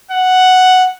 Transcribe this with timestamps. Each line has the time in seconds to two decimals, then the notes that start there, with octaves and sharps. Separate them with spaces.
0.11 F#5